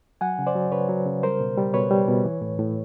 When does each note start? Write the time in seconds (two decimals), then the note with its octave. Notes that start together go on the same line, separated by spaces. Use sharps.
0.21 F#3 F#5 G#5
0.39 C#3
0.47 C5 D5
0.55 F#3
0.72 C#3 B4 C#5
0.89 F#3
1.06 C#3
1.23 G3 A#4 C5
1.40 B2
1.58 G3
1.74 B2 B4 C#5
1.90 G3
2.08 B2
2.24 E3
2.42 A2
2.59 A2